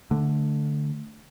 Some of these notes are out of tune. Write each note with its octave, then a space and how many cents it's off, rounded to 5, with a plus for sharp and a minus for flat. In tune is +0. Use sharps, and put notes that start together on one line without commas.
D3 +0 A3 +0